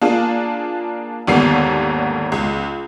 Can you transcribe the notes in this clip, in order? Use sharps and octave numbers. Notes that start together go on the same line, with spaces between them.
A#3 D4 F4 G#4
G#1 D#2 D3 G3 B3 C7
C#2